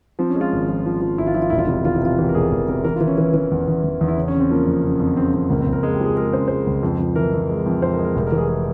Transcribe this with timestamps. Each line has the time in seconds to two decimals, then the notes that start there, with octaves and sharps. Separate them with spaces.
0.19 F3 C4
0.30 C#4
0.36 G#3
0.41 F4
0.52 G#1
0.69 F3
0.86 F3
1.01 F3
1.18 G#1 E4
1.27 F4
1.35 F3 E4
1.42 F4
1.50 E1 E4
1.59 F4
1.67 C3 E4
1.85 E3 F4
1.95 E4
2.02 C3 F4
2.18 E3 G4
2.29 A#4
2.35 E1 G#4
2.51 E1 A#4
2.68 C3 A#4
2.84 E3 A#4
2.96 F4
3.01 E3
3.07 C#4
3.18 E3
3.34 E3
3.51 E2
3.68 E2
3.84 E2
4.01 E2
4.08 E4
4.17 C#3 C#4
4.28 C#4
4.34 C#3
4.40 C4
4.50 F3 A#3
4.67 F2
4.83 C#3
5.00 F2
5.17 C#3 C4
5.34 F2 C4
5.50 C#2 A#3
5.61 C4
5.66 C#2
5.73 A#4
5.83 G#3 A#4
5.94 G4
6.00 F3
6.05 G#4
6.17 G#3 A#4
6.33 C#3 C5
6.48 G#3 C5
6.67 C#2
6.83 F2
6.99 F2
7.16 E3 A#4
7.33 F2
7.49 G#3
7.66 F2
7.82 F2 C5
7.93 A#4
7.99 G#3
8.04 A#4
8.16 F1 A#4
8.27 A#4
8.32 E3
8.38 G#4
8.49 G#4